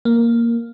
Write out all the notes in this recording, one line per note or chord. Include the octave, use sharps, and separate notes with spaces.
A#3